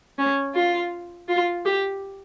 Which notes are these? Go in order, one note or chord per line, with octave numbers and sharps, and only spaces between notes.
C#4
F4
F4
G4